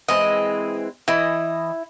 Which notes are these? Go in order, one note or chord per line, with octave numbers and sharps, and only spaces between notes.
E3 G#3 C4 D#5
E3 E4 D#5